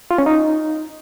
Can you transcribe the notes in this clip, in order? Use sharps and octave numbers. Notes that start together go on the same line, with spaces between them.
F4
C#4
D#4